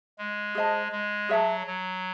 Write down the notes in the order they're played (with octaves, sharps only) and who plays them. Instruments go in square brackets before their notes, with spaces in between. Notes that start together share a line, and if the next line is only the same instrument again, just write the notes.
[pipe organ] G#3
[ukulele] G#4 C5 D#5 A5
[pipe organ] G#3
[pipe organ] F#3 [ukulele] G#4 C#5 E5 A5
[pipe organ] F#3